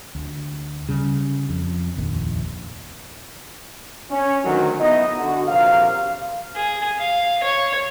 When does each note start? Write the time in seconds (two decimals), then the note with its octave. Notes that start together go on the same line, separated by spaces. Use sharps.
0.15 D2
0.89 C#3 G3
1.50 F2
1.97 F1 A#1 D#2
4.11 C#4
4.44 D2 D#3 F#3
4.80 B3 D#4 E4 D#5
5.17 D3 F#4
5.48 A#1 C3 F#3 A#3 F5
6.56 G#4
6.98 F5
7.43 C#5